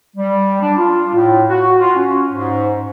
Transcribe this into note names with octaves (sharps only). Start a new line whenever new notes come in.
G3
D4
F4
A2
F#4
F4
C#4
G#2